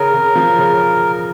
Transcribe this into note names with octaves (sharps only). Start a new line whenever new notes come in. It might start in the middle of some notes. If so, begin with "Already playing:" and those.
Already playing: C#3 A#4
C#3
F3
C#3